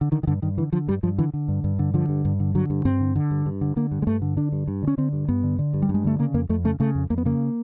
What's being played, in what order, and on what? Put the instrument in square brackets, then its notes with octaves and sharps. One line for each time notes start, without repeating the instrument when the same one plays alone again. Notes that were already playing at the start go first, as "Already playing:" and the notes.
[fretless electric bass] D3
D3 D#3
D#3
G2 D3
G2 D#3
D3 E3
D3 F3
G2 G3
G2 F3
D3 E3
D3
G2
G2
D3
D3 F3
G2
G2
D3
D3 F#3
G2
G2 C4
D3
D3
G2
G2
D3
D3 A#3
G2
G#3
G2 A3
D3
D3 D4
G2
G2
D3 C#4
D3 C4
G2
G2 B3
D3
D3
G2
G3
G2
G#3
D3 A3
C#3 A#3
F2 A#3
F2 A3
C#3 A3
C#3 A3
F2
F2 A#3
B3
C#3 A#3